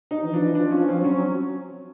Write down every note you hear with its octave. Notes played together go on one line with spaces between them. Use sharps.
D#4
E3
F3 D4
E3
F3 D4
C#4
F3
C4
F#3
C#4
F#3